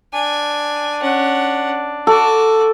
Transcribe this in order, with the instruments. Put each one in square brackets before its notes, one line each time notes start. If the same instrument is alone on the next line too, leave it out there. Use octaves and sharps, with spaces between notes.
[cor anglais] D4 [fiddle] G#5
[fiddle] C#4 F#5
[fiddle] F#4 D6 [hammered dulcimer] A4